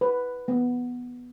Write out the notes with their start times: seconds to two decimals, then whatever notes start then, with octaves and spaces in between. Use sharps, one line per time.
0.01 B4
0.48 B3